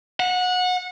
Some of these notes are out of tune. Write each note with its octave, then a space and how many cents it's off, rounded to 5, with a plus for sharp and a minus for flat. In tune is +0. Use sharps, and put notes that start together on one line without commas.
F#5 -25